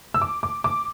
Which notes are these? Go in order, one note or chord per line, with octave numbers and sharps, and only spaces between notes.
E6
D6
D6
D6